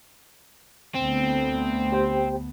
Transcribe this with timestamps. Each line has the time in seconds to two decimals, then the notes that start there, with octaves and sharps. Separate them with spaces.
0.95 D2 A3 B3 C4
1.92 G4 C5 G5